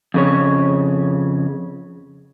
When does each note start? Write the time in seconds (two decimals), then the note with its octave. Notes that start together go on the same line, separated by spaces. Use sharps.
0.14 F2 C#3 C#5